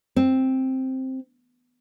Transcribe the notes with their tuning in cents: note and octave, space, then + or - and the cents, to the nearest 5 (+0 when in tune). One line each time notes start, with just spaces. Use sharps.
C4 +5